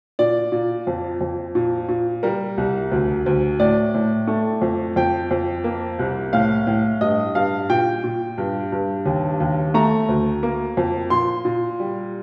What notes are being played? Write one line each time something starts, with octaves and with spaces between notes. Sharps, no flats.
A#2 D5
A#2
F2
F2
A#2
A#2
G3 A#4
C2
D2
D2
A2 D5
A2
A3
F2
F2 G5
F2
A#3
C2
A2 F5
A2
G2 D#5
G2 F5
A#2 G5
A#2
G2
G2
D#2
D#2
A3 A#5
D2
A#3
F2
A#2 C6
A#2
G3